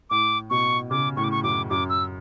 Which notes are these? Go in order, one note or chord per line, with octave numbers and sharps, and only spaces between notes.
A2 D6
B2 C#6
C#3 D6
A2 C#6
D6
C#6
F#2 D6
F#2 D6
E6